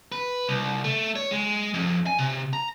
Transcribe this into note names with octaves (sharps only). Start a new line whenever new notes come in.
B4
C2
A3
C#5
G#3
F2
G#5
C3
A#5